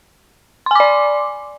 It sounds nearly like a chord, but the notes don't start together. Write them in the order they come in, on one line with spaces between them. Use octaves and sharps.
C6 G#5 D6 D5